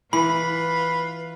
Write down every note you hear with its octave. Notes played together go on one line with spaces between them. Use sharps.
E3 F4 B4 B5